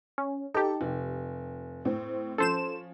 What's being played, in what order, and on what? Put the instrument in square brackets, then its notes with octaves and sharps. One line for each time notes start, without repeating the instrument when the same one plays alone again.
[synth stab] C#4
[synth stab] D#4 G4 [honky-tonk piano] A4
[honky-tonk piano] F1
A2 C4
[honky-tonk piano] F3 C#4 [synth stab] A4 C5 E7